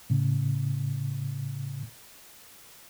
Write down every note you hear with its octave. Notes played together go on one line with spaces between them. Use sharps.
A2 C#3